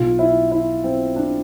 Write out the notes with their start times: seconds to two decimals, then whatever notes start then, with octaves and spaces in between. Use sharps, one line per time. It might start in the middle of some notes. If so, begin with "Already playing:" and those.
Already playing: B1 B2 F4
0.19 E4
0.51 E4
0.84 C4
1.16 D4